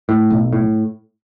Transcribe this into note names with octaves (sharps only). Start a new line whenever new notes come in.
A2
B1
A2